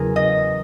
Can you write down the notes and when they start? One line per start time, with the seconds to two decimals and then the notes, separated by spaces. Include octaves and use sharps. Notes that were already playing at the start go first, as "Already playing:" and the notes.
Already playing: E2 C#3 F#3 G#4 A#4
0.16 D#5